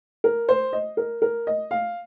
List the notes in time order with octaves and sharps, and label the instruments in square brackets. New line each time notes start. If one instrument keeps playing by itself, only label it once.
[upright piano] A#4
C5
D#5
A#4
A#4
D#5
F5